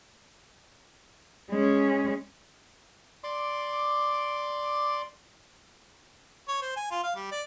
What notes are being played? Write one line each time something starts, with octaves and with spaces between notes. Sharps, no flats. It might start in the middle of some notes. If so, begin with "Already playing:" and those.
G#3 C#4
D5 C6 D6
C#5
C5
G#5
F4
F5
G3
D5